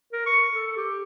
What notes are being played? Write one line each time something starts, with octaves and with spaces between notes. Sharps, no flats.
A#4
C#6
A4
G4